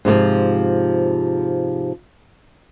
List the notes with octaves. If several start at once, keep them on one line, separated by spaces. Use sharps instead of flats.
G#2 C3 E3 F3